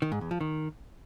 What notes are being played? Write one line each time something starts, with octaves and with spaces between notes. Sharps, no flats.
D#3
G#2
E2
F3
D#3